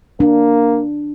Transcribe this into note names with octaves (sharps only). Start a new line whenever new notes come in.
A#3 D4